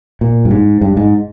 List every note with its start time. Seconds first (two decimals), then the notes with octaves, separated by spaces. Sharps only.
0.21 A#2
0.45 G2
0.51 G#2
0.81 G2
0.97 G#2